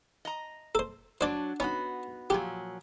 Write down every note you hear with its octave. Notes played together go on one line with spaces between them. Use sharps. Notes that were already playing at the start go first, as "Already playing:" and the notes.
D#5 A#5
A4 C5
F#3 D4 C5 D5
B3 C#4 D#4 F#4
A#2 F3 F#3 G4